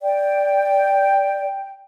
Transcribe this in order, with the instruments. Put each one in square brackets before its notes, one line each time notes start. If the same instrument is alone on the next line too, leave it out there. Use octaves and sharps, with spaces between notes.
[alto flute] D5 [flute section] G5